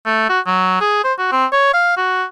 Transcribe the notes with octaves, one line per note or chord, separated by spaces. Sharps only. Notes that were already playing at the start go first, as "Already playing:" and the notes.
A3
F#4
F#3
G#4
C5
F#4
C4
C#5
F5
F#4